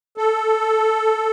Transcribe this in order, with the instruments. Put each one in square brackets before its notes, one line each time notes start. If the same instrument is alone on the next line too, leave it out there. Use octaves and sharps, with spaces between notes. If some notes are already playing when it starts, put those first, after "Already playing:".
[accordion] A4